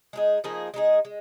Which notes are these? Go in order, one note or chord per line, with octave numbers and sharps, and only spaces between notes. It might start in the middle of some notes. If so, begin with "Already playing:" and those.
G#3 D#4 G#4
F3 A#3 D#4 G#4
G#3 D#4 G#4
G#3